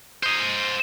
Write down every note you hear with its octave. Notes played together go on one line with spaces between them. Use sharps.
C5 D#5